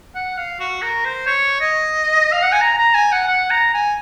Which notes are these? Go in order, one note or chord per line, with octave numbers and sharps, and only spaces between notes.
F#5
F5
F#4
A#4
C5
C#5
D#5
F5
F#5
G#5
A#5
A#5
G#5
F#5
F#5
A#5
G#5